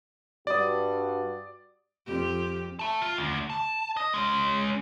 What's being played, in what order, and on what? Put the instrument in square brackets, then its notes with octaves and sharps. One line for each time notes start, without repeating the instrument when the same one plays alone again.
[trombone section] G2 F#4 [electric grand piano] D5 D#6
[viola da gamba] F2 G4
[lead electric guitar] E5 A5
F4
D2
A5
D#5
G#3 C#4